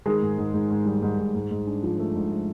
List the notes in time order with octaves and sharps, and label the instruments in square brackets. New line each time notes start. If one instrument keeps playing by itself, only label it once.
[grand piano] D#3 [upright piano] G#3 G#4
[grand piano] G#2
G#2
G#2
G#2
G3
G#2
G#2
G#2
G#2
D4
F3
A3
G#2
A3